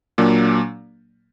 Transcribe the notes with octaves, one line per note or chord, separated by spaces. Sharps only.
A#2 F#3 A#3 D4